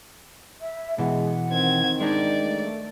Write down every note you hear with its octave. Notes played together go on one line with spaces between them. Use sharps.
E5
B2 E3 G#3 F#5
D#3 C4 G#6
G#3 D4 D#4 D5
A3